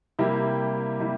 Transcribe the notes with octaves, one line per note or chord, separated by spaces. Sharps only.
C3 G3 A#3 E4 G4
C3 G3 A#3 E4